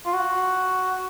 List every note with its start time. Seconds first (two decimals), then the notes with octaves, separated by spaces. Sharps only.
0.06 F4
0.13 F#4